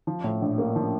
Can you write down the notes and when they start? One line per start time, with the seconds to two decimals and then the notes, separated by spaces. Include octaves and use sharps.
0.07 F3
0.24 A2
0.42 A#1
0.58 A#3
0.76 F3